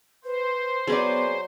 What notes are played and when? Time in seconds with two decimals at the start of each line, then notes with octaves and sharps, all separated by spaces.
0.24 B4 C5
0.87 F#3 B3 G#4 B4 D5